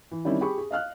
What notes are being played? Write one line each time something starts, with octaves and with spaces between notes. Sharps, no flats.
E3
D#3 G3 C4 C#4 D#4 E4
G4 G#4 B5 C#6
G#4
D#5 F5 F6 F#6